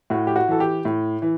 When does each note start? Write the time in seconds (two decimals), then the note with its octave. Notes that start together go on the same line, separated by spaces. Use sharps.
0.10 A2 F#4
0.27 G4
0.36 F#4
0.48 E3 A4
0.60 G4
0.85 A2
1.22 E3